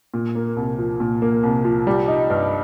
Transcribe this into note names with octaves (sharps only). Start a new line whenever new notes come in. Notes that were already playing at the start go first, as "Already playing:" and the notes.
A#2
A#3
C2
F3
A#2
A#3
C2
F3
G3
D#4
G2